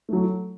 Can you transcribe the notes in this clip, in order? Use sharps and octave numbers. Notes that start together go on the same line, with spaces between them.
F#3 A3